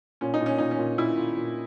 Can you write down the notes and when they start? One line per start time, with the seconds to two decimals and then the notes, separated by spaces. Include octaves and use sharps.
0.21 A#2 C#4
0.34 D#4
0.40 A#2
0.46 C#4
0.58 A#2 D#4
0.71 C#4
0.78 A#2
0.98 A#2 E4
1.17 A#2
1.37 A#2